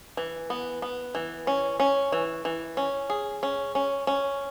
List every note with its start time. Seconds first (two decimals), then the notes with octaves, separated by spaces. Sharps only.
0.17 E3
0.50 B3
0.82 B3
1.15 E3
1.47 C#4
1.80 C#4
2.12 E3
2.45 E3
2.77 C#4
3.10 G#4
3.43 C#4
3.75 C#4
4.07 C#4